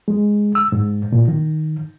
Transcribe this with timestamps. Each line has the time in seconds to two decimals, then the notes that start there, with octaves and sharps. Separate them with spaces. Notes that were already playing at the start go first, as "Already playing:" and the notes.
0.08 G#3
0.55 E6
0.72 G#2
1.12 A#2
1.28 D#3